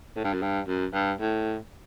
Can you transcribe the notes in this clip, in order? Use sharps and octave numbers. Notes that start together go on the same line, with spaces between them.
A2
G2
F#2
G2
F#2
G2
A2